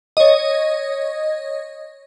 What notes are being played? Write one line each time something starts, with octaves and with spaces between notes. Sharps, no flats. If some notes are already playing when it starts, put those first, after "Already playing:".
C#5 D#5